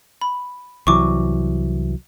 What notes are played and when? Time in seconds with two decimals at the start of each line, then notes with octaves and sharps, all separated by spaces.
0.21 B5
0.87 C2 E3 F#3 C#6 D6